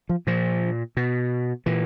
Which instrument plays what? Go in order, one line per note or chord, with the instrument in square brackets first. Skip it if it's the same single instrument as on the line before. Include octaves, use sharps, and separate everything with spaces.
[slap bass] F3
A#2 F3
B2
A#2 E3